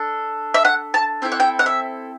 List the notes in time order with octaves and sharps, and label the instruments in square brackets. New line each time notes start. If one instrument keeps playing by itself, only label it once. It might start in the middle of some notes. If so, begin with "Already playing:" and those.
Already playing: [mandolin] D4 A4
E5
F#5
A5
C4 E4 A4 G5
F#5
G5
F#5
E5